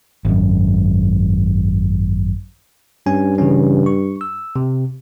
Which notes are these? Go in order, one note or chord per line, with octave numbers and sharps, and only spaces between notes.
G#1 F#2
G2 C#4 G#5
C#3 E3 C#4
C#6
E6
C3